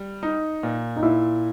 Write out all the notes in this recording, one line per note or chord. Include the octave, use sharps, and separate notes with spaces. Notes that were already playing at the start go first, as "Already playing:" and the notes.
Already playing: G3
D#4
A#2
D#4
A#2 E4